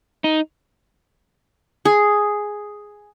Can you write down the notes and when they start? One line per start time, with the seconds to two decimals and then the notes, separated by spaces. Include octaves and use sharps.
0.24 D#4
1.85 G#4